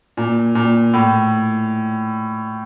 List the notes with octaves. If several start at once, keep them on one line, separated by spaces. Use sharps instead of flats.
A#2
A#2
A2